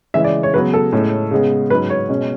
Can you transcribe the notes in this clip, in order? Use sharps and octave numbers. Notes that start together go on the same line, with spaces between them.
C#3 E3 G#3 E5
D5
C#5
C#3 F#3 B3 B4
A4
A2 G#3 C#4
C#3 G#3 B3
G#2 F#3 C#4 B4
C#5
B2 G#3 C#4